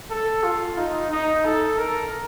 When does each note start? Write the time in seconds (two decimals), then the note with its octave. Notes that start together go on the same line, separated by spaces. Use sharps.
0.10 A4
0.44 F4
0.78 D#4
1.11 D#4
1.45 A4
1.78 A#4